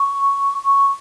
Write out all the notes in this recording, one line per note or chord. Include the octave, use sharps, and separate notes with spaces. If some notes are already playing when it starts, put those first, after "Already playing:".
Already playing: C#6
C#6